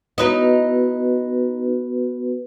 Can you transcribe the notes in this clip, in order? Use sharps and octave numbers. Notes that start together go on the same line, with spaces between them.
B3 D#4 E4 F#4 B4 D#5